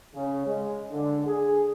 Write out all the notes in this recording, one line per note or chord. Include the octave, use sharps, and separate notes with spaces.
C#3
G#3
D3
G#4